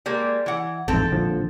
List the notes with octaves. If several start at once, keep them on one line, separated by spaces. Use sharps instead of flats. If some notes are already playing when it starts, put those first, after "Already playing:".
G3 G#3 A#3
E3 F#5
A1 F2 G#2 C4 A4
A#1 D3 F3